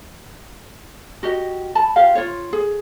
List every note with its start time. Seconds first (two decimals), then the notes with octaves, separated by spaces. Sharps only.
1.23 F#4 G4 D#5
1.75 A5 B5
1.96 F4 G4 F5
2.15 F4 C#5
2.53 G#4